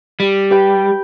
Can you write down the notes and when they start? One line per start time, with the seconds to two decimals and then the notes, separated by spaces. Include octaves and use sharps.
0.20 G3
0.50 G4 B4 G5